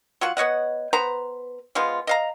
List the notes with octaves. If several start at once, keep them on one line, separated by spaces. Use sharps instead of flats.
F#3 F4 F#5
B3 C#5 D#5 F#5
B3 B4 C5 A#5
F3 G#3 B3 F4
D#5 F5 A#5